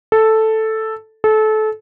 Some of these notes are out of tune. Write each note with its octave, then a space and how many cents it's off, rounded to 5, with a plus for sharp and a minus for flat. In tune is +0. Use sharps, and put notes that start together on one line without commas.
A4 +0
A4 -25